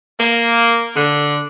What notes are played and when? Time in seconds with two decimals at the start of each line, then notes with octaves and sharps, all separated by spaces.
0.19 A#3
0.96 D3